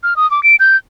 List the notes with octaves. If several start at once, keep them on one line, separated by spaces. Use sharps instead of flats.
F6
D#6
D6
D7
G6